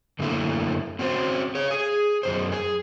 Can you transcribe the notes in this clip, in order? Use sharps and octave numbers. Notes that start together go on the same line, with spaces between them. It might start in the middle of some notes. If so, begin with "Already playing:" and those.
F#2 D3 G3 A3 A#3 E4
C4 C#4 F#4 C5
G#4 C#5
G#4
F#2 C3 C5
G#4